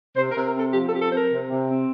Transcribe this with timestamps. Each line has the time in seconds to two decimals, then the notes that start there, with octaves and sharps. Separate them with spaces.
0.16 C3 C5
0.31 A#4
0.36 C3
0.44 A#4
0.55 C4 A4
0.73 F3 G4
0.88 A4
0.92 C4 G4
1.02 A4
1.12 C4 C5
1.16 A#4
1.30 C3
1.49 C3
1.68 C4